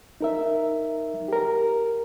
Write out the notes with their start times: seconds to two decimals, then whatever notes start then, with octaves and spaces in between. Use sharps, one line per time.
0.21 D#4 A#4 E5
1.28 G4 A#4